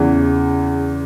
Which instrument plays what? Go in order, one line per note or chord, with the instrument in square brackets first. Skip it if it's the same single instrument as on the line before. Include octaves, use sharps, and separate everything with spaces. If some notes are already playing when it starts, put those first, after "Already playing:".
Already playing: [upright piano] E2 C#3 E3